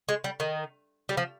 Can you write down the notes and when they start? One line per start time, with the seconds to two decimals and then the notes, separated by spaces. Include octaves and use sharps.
0.09 G#3
0.24 G3
0.40 D#3
1.09 G3
1.17 F3